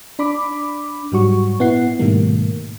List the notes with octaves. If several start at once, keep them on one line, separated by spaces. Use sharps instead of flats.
D4 B5 D6
G#2 F#3 G3 F#4 C#6
A#2 B3 E4 F#5 C7
G#2 B2 D#3 G3 A3 A#3